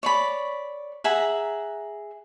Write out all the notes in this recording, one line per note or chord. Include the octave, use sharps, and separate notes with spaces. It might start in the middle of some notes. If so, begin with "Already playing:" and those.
C#5 D5 B5
G#4 E5 F#5 A#5